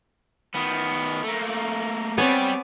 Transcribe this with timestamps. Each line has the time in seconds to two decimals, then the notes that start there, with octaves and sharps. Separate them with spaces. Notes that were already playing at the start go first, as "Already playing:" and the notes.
0.54 D#3 B3
1.24 A3 A#3
2.18 G3 B3 C4 G4 C#5 D5 G#5